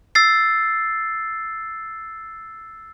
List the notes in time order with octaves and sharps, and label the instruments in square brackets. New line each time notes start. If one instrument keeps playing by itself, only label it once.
[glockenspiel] E6 A6 C7